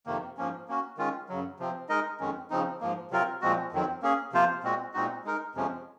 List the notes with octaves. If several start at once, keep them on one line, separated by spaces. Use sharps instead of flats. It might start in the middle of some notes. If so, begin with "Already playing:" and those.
F2 C3 D#3 A#3
G#2 F3 A#3 C#4
A#3 C#4 F#4
D#3 G#3 C#4 F4
F#2 C#3 F#3
C3 F3 C4
G#3 D#4 A#4 D#5
F2 D#3 G#3 C#4
C#3 F3 C4 D#4
G#2 F3 A#3
C3 F#3 C4 F4 A#4
A#2 F3 G#3 C4 F#4
F2 D#3 F#3 C4
A#3 C#4 G#4
C3 F3 A#3 F4 C5
A#2 G#3 C4 F#4
A#2 G#3 C4 D#4 F#4
G#3 D#4 A#4
F2 C3 F3 G#3 C#4